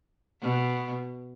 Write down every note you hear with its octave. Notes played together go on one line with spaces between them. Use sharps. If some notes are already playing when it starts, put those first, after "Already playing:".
B2